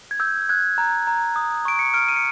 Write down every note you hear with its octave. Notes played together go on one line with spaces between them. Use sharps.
G#6
E6 G6
F#6 G#6
A#5
A#5
D#6
C#6 D7
C#7
F6 D7
D#7
C#7